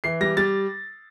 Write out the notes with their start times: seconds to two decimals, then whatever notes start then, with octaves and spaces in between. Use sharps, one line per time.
0.04 E3 C7
0.21 G3 A#6
0.37 G3 A6